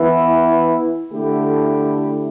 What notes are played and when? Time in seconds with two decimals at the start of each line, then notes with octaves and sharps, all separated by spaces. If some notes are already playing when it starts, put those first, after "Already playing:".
Already playing: E3 B3 E4
1.12 D3 A3 E4 G4